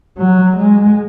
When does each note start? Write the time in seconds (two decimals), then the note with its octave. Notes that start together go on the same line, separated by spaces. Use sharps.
0.18 F#3
0.57 G#3